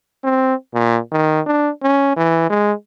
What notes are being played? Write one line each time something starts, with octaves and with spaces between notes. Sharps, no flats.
C4
A#2
D#3
D4
C#4
E3
G#3